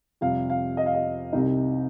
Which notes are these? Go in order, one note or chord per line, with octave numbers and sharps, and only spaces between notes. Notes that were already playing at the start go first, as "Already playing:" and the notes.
F2 C3 G3 F5
F5
D#5
F5
D#5
C2 C3 G3 C4 D#4